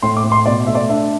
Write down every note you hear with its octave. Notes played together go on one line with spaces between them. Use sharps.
A2 C6
D6
A2
C6
B2 D5
A3 E5
D5
D4 E5